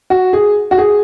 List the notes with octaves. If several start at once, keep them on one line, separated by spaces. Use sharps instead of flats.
F#4
G#4
F#4
G#4